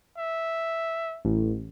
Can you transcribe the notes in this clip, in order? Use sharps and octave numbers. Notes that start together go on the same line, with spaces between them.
E5
A1